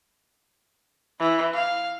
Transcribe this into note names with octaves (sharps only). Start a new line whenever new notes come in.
E3
F5